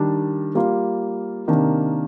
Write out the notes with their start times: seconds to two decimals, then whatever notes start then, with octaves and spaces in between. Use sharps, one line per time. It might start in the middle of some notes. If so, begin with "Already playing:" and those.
Already playing: D#3 G3 D4
0.55 G3 A#3 F4
1.47 C3 D#3 A#3 D4